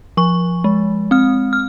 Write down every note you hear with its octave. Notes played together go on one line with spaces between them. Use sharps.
F3 C#6
G#3
C4 F6
F6